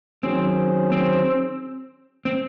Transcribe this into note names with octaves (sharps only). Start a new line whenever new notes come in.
D#3 F#3 C4 C#4 G#4 C5
C4
C4